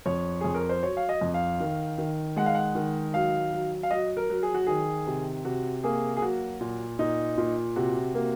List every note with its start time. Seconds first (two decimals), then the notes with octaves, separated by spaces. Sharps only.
0.06 F2 C#5
0.41 F2 G#4
0.55 A#4
0.69 C5
0.83 F#3 C#5
0.97 F5
1.09 D#5
1.21 F2
1.34 F5
1.60 D#3
1.98 D#3
2.36 G#3 F#5
2.46 F5
2.55 F#5
2.75 D#3
3.14 F#3 F5
3.53 F#3
3.83 F5
3.91 F#3 D#5
4.17 A#4
4.30 F#3
4.43 G#4
4.54 F#4
4.67 D#3 G#4
5.07 C3
5.45 C3 F#4
5.84 A#3 G#4
6.17 G#4
6.22 F#3 F#4
6.61 A#2
6.99 A#2 D#4
7.38 A#2
7.76 C3 F#4
8.15 A#3